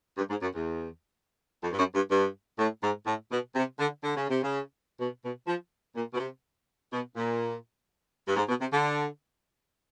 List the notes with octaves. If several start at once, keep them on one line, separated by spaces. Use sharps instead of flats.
G2
G#2
F#2
E2
F2
G2
F#2
G2
G2
A2
G#2
A2
B2
C3
D3
D3
C#3
C3
C#3
B2
B2
F3
A#2
B2
C3
B2
A#2
G2
G#2
B2
C3
D3